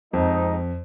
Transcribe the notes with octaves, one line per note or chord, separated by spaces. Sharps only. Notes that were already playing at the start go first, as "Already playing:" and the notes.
F2 G#3 C4 D#4